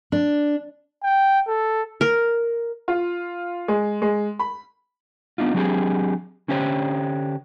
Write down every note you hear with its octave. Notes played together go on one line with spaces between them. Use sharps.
D4
G5
A4
A#4
F4
G#3
G#3
B5
B3 D4 D#4 F4
F#3 C4 D4 G4 G#4
D3 C#4 D4 G4 C5 C#5